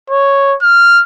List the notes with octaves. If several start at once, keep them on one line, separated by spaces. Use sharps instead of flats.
C#5
F6